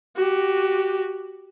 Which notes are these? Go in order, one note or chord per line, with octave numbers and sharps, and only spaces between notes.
F#4 G4